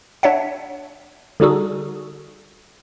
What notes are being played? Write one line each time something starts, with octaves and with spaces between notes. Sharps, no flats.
D4 C#5 E5 F#5
D3 G3 D#4 F#4 G#4 A4